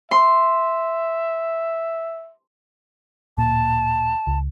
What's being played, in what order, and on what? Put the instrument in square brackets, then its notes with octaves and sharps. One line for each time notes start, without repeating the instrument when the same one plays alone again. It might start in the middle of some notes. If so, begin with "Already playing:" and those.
[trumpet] E5 [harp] C6
[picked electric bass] D1 A#2 A#3 [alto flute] A5
[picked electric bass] C#2